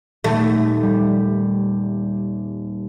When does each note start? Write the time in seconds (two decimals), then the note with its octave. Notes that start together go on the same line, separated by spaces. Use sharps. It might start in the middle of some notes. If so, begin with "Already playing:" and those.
0.24 D#1 A3
0.83 G3